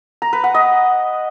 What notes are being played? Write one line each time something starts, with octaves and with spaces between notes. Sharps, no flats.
A#5
B4
F#5
D#5